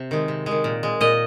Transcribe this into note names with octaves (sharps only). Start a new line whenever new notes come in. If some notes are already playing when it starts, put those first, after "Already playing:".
Already playing: C3 C4
D#3 G#3
C3
D#3 G#3
A#2
G#3
A#2 D#5